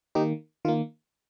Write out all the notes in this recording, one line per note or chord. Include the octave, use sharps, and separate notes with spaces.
D#3 A#3 D#4 G4
D#3 A#3 F4